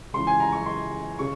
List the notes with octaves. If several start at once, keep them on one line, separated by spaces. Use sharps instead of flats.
C#2 C#3 E3 C6
G#5
A#5
C#6
C6
C#3 C#6